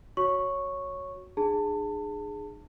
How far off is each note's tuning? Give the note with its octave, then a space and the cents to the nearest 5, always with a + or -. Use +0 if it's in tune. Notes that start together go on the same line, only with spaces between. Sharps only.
F#4 +0 C#5 +0 C#6 -5
D#4 -45 G#4 +0 A5 +25